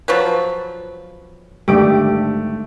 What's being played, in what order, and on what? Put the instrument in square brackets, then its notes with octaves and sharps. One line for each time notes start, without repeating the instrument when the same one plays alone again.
[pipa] F3 F#3 B4
[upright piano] G#1 A3 D7 [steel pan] D3 G3 G4